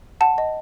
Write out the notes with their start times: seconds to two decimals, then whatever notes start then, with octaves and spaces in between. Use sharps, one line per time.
0.21 F#5 A5
0.38 D#5